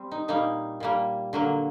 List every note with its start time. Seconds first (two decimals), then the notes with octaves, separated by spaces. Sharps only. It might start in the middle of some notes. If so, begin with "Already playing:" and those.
Already playing: G3 C4
0.11 D#4
0.28 A#2 G3 A#3 D#4
0.80 A#2 G3 A#3
1.33 D3 F#3 A#3